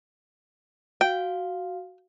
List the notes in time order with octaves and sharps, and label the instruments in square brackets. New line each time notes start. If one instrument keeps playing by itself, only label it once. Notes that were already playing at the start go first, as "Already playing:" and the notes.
[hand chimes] F#4 F5 [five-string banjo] G5